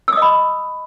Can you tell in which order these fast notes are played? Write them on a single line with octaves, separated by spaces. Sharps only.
E6 D#6 D#5 B5